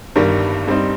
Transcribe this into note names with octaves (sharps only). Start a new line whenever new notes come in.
G1 G2 D#3 G3 A#4
G2 G3 C4 D#4